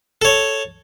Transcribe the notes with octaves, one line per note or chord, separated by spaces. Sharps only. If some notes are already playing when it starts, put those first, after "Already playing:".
A4 C#5